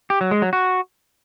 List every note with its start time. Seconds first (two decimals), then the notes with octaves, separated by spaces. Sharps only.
0.10 G4
0.21 F#3
0.31 G#3
0.42 F#3
0.53 F#4